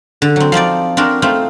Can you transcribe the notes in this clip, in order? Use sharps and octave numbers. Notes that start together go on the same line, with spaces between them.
D3
F#3 C4
F3 C4 D#4 D5
C4 D4 F#4 A#4
A3 C4 D#4 F4